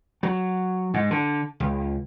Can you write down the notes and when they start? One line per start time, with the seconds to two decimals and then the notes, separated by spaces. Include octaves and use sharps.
0.23 F#3
0.94 G#2
1.11 D3
1.60 C#2